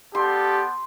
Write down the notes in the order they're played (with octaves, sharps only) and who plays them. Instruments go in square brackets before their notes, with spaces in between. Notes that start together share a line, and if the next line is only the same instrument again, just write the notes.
[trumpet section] B3 D4 A4 [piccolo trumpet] G4 [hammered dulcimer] C6